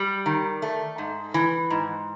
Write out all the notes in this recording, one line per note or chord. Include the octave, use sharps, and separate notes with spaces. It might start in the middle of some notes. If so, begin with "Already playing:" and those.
Already playing: G3
D#3
A3
G#2
E3
G#2